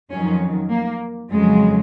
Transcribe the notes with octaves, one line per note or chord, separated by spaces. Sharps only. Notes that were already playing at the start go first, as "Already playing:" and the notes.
F2 D#3 F#3 C#4
A#3
F2 C#3 F#3 G#3